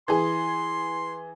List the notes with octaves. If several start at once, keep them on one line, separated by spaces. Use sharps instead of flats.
E3 G#4 C6